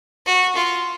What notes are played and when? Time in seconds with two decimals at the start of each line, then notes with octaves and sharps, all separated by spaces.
0.26 F#4
0.56 F4